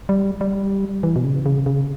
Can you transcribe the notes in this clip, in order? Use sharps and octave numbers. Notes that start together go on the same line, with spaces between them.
G3
G3
E3
B2
C#3
C#3
C#3